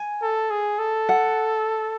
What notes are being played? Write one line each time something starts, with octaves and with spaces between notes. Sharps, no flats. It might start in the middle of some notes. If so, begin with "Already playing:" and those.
Already playing: G#5
A4
G#4
A4
F#5